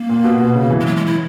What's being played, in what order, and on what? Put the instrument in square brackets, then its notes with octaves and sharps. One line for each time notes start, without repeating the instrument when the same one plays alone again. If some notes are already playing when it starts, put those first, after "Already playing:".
Already playing: [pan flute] A#3
[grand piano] A#2
B2
B2
C#3
E3
[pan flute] G#3
F#3
G#3
E4